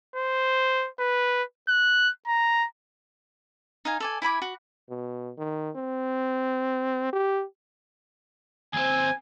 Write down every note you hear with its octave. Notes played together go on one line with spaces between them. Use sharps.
C5
B4
F#6
A#5
D#4 F5 G#5
A4 D5 G#5
E4 G#5 B5 D6
F#4
B2
D#3
C4
G4
D#2 C4 G#5